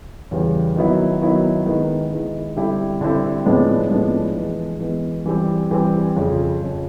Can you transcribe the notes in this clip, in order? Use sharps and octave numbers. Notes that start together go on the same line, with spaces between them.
E2 C#3 E3 G3
D#3 F#3 B3 E4
D#3 F#3 B3 E4
D#3 G#3 B3 E4
D#3 G#3 B3 E4
D3 G3 C4 E4
D3 G3 C4 E4
A2 F3 G#3 B3 D4
A2 F3 G#3 B3 D4
E3 G#3 B3
E3 G#3 B3
E3 G3 C4
E3 G3 C4
F2 C#3 F3
F2 C#3 F3